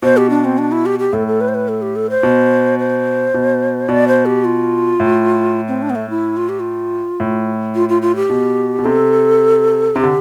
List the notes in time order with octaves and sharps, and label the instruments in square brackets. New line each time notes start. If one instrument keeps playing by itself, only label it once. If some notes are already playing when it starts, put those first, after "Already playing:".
[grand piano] B2 [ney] C5
[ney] G4
D4
C4
D4
E4
G4
G4
[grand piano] A2 [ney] A4
[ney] A4
B4
C5
B4
A4
G4
A4
C5
[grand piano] B2
[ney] C5
[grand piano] B2
[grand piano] B2 [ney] D5
[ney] C5
G4
F4
[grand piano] A2
[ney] C4
D4
B3
A3
E4
F4
G4
F4
[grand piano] A2
[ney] F4
F4
F4
G4
[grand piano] B2
B2
[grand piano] C3 [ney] A4
[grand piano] C3 [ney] G4
[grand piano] D3